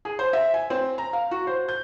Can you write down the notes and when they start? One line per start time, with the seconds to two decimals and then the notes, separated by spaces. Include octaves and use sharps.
0.05 G#4
0.19 C5
0.33 E5
0.54 G#5
0.70 C4
0.98 A#5
1.13 F5
1.31 F#4
1.47 C5
1.68 G6